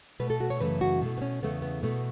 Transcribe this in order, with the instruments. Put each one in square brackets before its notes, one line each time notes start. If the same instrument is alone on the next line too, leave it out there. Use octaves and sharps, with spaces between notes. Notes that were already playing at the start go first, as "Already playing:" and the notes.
[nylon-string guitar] B2 A3 B4
A4
F#4
C#5
F#2 C#3 E3 A3 B4
F#4
B2 A3
B3
C#4
E2 C#3 A3 B3
B3
B2 A3 B3